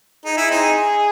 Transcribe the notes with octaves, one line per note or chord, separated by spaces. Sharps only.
D#4 G#4
E4
C4 D#4